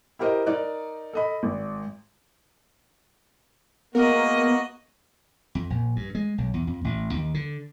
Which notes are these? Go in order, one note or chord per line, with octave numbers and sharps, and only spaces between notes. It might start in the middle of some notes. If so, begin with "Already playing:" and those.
E4 G4 A#4 C5 D#5
D#4 A#4 D5 F#6
A4 D#5 B5
G#1
G#3 A#3 B3 F#4 A#4 D#5
F2
A#1
G2
G#3
B1
E2
F2
A1
D#2
D3